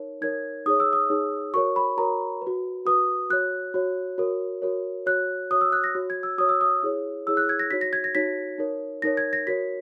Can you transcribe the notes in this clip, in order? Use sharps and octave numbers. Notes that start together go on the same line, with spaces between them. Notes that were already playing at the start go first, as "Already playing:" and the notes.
Already playing: D#4 A#4 C#5
D#4 A#4 C#5 G#6
D#4 G#4 C#5 D#6
E6
D#6
D#4 G#4 C#5
F#4 A#4 C#5 C#6
B5
F#4 A#4 C#5 A#5
B4
F#4
F#4 B4 D#6
F#4 C#5 F#6
F#4 C#5
F#4 A#4 C#5
F#4 A#4 C#5
F#4 C#5 F#6
F#4 C#5 D#6
E6
F#6
A#6
F#4 C#5
G#6
E6
F#4 C#5 D#6
E6
D#6
E4 G#4 C#5
E4 G#4 C#5 E6
F#6
G#6
A#6
D#4 F#4 C#5 B6
A#6
G#6
A#6
D#4 F#4 C#5 B6
D#4 A#4 C#5
D#4 A#4 C#5 A#6
G#6
A#6
F#4 A#4 C#5 B6